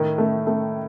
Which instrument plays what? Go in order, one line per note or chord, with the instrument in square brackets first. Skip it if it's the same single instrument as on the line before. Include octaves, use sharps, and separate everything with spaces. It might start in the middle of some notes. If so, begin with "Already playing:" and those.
Already playing: [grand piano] A2 [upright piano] D#3
[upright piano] A3
A3